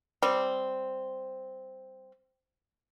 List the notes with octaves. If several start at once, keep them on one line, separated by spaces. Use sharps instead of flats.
G3 C4